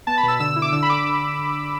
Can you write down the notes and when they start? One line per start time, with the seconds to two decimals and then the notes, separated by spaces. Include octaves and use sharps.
0.07 B3 A5
0.18 B5
0.23 B2 E6
0.40 D3 E6
0.56 E4
0.62 D6
0.72 D3 E6
0.83 B5
0.89 D3 D6